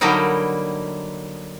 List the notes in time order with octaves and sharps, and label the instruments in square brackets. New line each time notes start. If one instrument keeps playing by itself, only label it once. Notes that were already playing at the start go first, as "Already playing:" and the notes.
[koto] D3 F#3 G3 A#3 D#4 E4